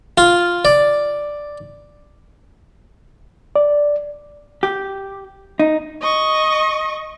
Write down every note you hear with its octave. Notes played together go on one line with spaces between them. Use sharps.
F4
D5
D5
G4
D#4
D#5 C#6